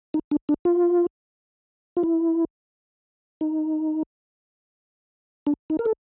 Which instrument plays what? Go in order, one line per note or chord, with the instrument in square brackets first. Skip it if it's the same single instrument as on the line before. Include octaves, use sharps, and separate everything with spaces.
[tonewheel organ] D#4
D4
D4
F4
F4
E4
D#4
D4
D#4
A#4
A4